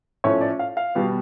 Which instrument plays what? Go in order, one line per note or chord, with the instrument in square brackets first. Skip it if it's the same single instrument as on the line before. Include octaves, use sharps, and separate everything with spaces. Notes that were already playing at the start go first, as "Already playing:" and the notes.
[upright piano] A2 F3 A3 C#4 C#5
D5
F5
F5
B2 G3 B3